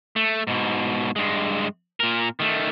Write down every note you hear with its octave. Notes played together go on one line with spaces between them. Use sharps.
A3
G#2 B2
G2 G#3
A#2 A#4
D#3 A3